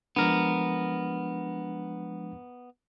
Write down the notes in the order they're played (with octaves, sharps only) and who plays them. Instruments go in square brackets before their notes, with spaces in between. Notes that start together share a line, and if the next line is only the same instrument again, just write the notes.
[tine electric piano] F3 G#3 D4 [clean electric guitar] B3 A#4